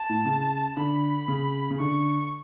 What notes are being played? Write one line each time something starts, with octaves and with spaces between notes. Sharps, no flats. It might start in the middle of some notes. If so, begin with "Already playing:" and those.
Already playing: A5
A2
C#3
D3 B5
C#3
C#3
D3 C#6